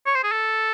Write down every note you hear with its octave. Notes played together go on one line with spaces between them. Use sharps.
C#5
C5
G#4
A4